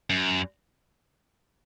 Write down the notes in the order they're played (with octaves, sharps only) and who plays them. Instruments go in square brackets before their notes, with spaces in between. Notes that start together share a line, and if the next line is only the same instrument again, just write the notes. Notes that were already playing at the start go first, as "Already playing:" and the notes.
[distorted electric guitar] F#2